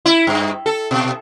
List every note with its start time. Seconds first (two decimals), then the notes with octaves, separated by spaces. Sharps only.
0.06 E4
0.27 G2
0.66 A4
0.91 B2